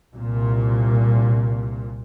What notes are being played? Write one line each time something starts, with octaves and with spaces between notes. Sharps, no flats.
C2 A#2